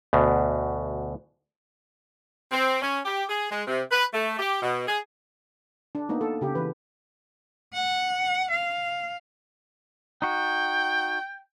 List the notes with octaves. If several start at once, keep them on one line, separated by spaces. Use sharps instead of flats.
D2 B2
C4
C#4
G4
G#4
G#3
C3
B4
A3
G4
B2
G#4
D4
A#3 B3 D#4
A4
C#3 G4
E3 B4
F#5
F5
D#4 F#4 G5